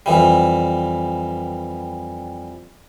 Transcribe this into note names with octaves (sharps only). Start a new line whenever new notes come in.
F2 E3 G3